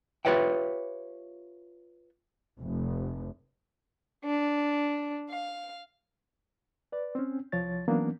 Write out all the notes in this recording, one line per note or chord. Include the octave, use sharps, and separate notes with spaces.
F4 G4 B4 C#5 E5 G5
F1
D4
F5
B4 D5
C4 C#4
C2 F3 C#5 A6
E3 F#3 A#3 B3 C#4 D4